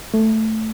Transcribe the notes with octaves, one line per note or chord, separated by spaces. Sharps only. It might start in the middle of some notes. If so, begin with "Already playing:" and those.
A3